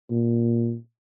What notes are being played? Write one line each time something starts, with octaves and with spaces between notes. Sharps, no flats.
A#2